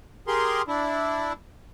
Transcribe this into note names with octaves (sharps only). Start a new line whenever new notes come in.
G4 G#4 A#4 C6
D4 E4